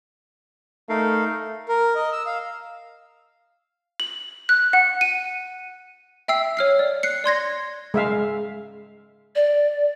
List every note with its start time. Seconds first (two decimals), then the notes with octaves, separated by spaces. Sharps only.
0.89 A3 D#4 A#4 F5
1.69 A#4
1.95 D#5
2.13 E6
2.26 F5
4.00 F#7
4.49 F#6
4.73 F#5
5.01 D#7
6.28 E5 G5 E6 C7
6.57 C#5 F6 C7
6.79 D5
7.03 F#6 C7 C#7
7.24 D5 C6 G#6 A#6
7.94 G#3 E5 F5
9.35 D5